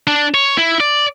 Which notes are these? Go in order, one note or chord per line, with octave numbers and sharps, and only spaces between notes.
D4
C#5
E4
D5